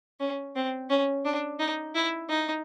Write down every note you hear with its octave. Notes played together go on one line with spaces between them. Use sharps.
C#4
C4
C#4
D4
D#4
E4
D#4